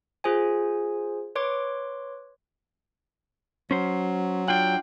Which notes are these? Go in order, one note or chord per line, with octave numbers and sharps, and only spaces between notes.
F4 G#4 C5 G#5
B4 C#5 C6 D6
F#3 C#4 C5
D4 F4 F#5 G5